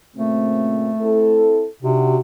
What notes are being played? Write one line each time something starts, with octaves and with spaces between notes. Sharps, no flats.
A#2 C#3 A3 C4
C4 E4 A4
C3 D4 D#4 F#4